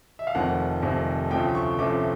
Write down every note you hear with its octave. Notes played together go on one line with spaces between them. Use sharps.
E5
F5
F1 F2 C3 D#3 F#5
F1 F2 C3 D#3
D2 C3 F3 A3 C#4 G5
C#6
D2 C3 F3 A3 C#4 D6